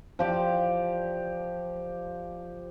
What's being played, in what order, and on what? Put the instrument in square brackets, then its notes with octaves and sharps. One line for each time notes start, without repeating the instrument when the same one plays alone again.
[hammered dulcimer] F3 G4 D5